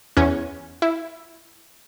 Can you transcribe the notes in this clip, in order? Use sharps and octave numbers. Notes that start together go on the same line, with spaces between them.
E2 C#4
E4